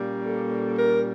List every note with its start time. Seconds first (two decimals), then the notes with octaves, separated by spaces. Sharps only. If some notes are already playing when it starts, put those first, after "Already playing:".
Already playing: A#2 G3 A#3 C#4
0.25 A4
0.77 A#4